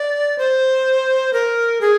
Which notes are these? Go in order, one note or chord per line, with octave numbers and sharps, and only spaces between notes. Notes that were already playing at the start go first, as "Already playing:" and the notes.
Already playing: D5
C5
A#4
G#4